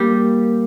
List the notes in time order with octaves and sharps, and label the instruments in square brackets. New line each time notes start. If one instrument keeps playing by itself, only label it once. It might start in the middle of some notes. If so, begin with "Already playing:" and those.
Already playing: [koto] G3 [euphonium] A#3